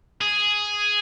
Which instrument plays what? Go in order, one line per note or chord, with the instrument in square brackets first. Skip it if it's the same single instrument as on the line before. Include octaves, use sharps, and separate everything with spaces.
[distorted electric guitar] G#4